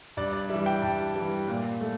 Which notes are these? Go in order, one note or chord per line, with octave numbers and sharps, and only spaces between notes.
G2 D5
D5
E3 G3 E5
G5
G2 A5
E3 G3
A#2
A3